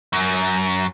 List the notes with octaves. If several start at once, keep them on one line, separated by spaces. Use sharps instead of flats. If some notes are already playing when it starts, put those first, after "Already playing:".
F#2